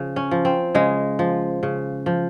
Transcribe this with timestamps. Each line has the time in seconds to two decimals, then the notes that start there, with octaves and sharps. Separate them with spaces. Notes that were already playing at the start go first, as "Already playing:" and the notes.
Already playing: C#3 F3
0.16 C#4
0.31 F3
0.45 C4
0.75 C#3 G#3
1.19 F3
1.63 C#3
2.06 F3